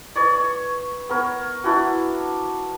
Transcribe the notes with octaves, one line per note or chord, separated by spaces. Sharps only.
B4 C#5 D5
C#6
B3 A#4 C#5
D4 E4 F#4